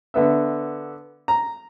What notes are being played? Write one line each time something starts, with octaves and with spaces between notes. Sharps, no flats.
D3 B3 E5
A#5